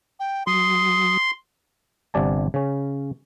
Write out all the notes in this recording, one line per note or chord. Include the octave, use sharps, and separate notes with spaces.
G5
F#3 C6 D#6
G1 C3 D5 G#5 A5
C#3 C#4